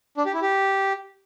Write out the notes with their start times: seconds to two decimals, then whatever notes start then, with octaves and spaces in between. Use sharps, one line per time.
0.17 D4
0.26 G4
0.34 E4
0.42 G4